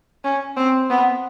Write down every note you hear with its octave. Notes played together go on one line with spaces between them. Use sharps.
C#4
C4
B3